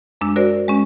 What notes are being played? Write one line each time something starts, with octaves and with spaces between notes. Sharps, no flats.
F#2 G#3 D4 E6
F#4 A#4 C5 D5
G#3 C#4